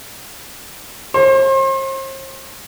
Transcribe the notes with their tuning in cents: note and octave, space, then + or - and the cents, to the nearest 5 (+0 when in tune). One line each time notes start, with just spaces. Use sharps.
C5 +40